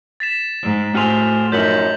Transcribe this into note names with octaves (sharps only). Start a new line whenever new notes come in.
A6 B6 E7
G#2
A2 F#4 G#4 C5 F6 F7
F#2 F3 F#3 D#4 G6 B6 F#7